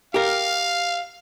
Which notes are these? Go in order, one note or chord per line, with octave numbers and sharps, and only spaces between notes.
G4 A#4 F5